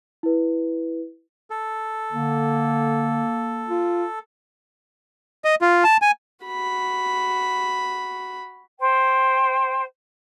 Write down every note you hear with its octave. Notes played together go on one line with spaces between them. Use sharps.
E4 B4
A4
D3 A#3
F4
D#5
F4
A5
G#5
F#4 B5
C5 G5